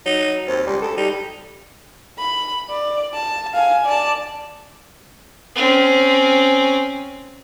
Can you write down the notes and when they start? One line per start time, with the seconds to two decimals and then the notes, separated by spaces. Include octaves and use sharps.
0.06 F#3 D#4
0.47 D#2 C4
0.66 C#2 G3
0.82 D2 A4
0.97 G3 D#4
2.19 B5
2.70 D5
3.14 A5
3.54 F5 G#5
3.86 D5 A5
5.56 C4 C#4